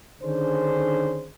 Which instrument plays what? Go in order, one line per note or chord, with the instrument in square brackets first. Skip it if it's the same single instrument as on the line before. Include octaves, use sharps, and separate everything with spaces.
[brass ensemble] D3 D#3 C#4 D4 G#4 C5